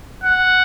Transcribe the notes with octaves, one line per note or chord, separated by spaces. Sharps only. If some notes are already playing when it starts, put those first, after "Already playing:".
F#5